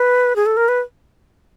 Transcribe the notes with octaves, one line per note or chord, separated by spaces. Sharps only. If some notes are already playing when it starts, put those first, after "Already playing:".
Already playing: B4
G#4
A4
A#4
B4